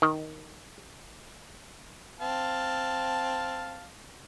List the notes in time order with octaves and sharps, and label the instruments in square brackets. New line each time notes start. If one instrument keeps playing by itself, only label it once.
[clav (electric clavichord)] D#3
[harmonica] C4 F5 A5